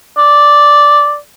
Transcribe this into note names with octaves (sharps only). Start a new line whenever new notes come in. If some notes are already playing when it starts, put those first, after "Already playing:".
D5